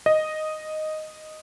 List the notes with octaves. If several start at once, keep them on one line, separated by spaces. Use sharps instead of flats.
D#5